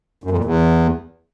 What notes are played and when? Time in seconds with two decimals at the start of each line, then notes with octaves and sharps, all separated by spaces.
0.24 F#2
0.31 F2
0.38 A#2
0.45 E2